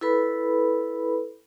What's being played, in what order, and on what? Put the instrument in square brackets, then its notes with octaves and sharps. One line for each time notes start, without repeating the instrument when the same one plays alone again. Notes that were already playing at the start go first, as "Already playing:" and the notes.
[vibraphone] E4 A4 B4 B5